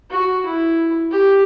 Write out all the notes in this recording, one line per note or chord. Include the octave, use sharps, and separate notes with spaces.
F#4
E4
G4